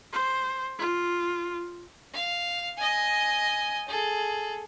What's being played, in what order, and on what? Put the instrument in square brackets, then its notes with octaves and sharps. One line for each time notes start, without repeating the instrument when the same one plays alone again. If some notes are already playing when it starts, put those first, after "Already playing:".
[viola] C5
F4
[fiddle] F5
D#5 G#5
G#4 A4